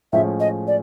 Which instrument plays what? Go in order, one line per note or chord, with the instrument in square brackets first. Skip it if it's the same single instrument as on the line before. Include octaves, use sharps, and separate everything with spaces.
[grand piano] A2 F3 G#3 C#4 [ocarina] E5
[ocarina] D#5
D5